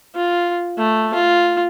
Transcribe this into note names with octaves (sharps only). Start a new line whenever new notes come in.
F4
A3
F4